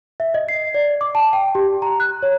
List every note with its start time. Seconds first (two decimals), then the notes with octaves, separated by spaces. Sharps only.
0.20 E5
0.34 D#5
0.49 C7
0.75 D5
1.01 D6
1.15 A5
1.33 G5
1.55 G4
1.82 A#5
2.00 F#6
2.23 C#5